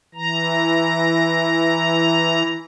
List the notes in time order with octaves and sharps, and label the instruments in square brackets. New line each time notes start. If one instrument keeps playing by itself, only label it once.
[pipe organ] E3 A#5